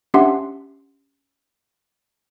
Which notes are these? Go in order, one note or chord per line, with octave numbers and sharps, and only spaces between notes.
C#4 D4 G4 E5 F#5 C6